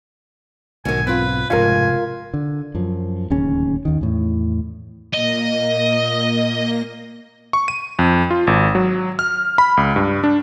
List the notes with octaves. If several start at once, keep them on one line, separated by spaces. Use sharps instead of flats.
B1 G#2 B2 D3 D#3 G#5
C4 F4 B4
F1 F2 G#2 B2 F4 A#4 G#5
D3
F#2 F3
D1 D#2 C#3 C#4
D#2 D#3
E2 A2
A#2 A#3 D#5 A#6
C#6
D#7
F2
F4
G#1
F#3
F6
B5
C#2
G2
D4